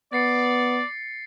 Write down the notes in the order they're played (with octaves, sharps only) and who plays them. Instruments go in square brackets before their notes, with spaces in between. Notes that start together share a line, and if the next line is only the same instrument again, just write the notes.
[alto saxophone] B3 [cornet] D5 [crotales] A6 C7 C#7